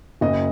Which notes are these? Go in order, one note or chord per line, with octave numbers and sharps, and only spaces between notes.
F#1 D#5